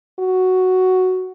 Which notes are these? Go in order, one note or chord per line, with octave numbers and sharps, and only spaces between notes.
F#4